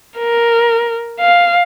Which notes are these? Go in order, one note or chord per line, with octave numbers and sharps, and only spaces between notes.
A#4
F5